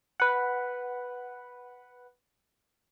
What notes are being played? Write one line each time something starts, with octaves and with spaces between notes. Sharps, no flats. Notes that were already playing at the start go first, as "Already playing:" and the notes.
B4 F#5